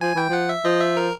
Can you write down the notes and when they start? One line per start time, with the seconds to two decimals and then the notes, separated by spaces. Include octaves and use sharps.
0.01 F3 G#5
0.15 E3 G5
0.29 F3 F#5
0.49 E5
0.65 F3 D#5
0.81 E5
0.97 A#4